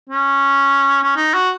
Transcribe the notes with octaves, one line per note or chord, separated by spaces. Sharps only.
C#4
C#4
D#4
F#4